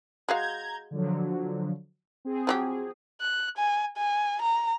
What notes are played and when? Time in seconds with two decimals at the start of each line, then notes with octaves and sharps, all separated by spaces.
0.29 G#3 F#4 F5 A#5 G6 G#6
0.91 D3 F3 F#3
2.25 C4 G#4
2.47 F3 F#3 G4
3.21 F#6
3.57 G#5
3.97 G#5
4.42 A#5